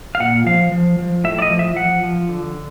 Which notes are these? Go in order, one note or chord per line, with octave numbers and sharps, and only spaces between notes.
F5
A#2 F#5
F3 F5
F3
F3
A2 E5
D5
D#5
F3
E5
F3 F#5
F3
D3